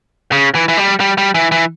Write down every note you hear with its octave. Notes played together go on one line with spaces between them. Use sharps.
C#3
E3
E3
G3
G3
G3
E3
E3